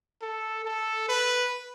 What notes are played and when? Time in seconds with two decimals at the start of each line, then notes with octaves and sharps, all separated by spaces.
0.22 A4
0.65 A4
1.08 B4